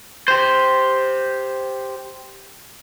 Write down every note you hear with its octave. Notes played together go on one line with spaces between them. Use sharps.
G4 C5